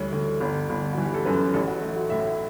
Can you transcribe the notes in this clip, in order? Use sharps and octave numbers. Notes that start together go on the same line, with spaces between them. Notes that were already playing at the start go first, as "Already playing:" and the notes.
Already playing: D2 E3 G3 C#5
D2
G1
G1
E3 F#4
G4
A4
F#2 B4
A1 A4
F#4
A3
F#4
A2 E5